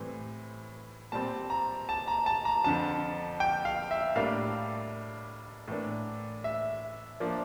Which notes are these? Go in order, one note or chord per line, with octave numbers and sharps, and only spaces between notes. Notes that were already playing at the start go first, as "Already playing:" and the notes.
Already playing: A2 E3 G3 C4
A#2 G3 C4 A5
A#5
A5
A#5
A5
A#5
F2 D3 F3 A5
G5
F5
E5
A2 G3 A#3 D4 F5
A2 E3 A#3 D4
E5
F3 A#3 D4